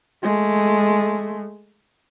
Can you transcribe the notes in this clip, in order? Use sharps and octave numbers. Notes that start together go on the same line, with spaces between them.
G#3 A3